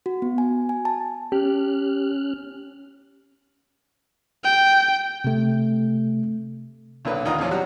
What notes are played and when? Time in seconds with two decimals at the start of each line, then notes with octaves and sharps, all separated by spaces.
0.06 F#4
0.22 B3
0.38 G#5
0.69 G#5
0.85 A5
1.32 C#4 G4 F6 F#6
4.44 G5
5.24 C3 A3
7.05 B1 A#2 D3 C#4 B4
7.25 D2 D#3 F4 D#5 A#5
7.39 E2 A#2 F3 C#4
7.51 F#3 G3 F#4